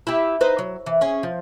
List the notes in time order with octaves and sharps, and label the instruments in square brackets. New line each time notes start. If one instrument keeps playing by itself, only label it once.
[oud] E4 G4
D#4 B4 C5
F#3
E3
C#4 G#4
F3